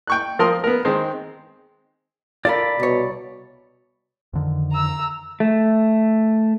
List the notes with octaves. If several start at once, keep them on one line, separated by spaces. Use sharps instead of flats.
G5 C#6 F#6
F3 A#4 C6 D#6
B3 A#4
D#3 G#3 C4
F4 A4 A#4 D5 B5
C2 B2 C#5
F2 D3 D#3
A#5 E6
A3